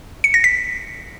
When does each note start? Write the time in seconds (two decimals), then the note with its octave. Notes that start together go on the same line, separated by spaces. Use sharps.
0.24 C#7
0.34 A#6
0.44 B6